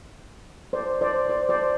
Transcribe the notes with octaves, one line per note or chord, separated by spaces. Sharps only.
C5 D5
C5 D5
C5 D5
C5 D5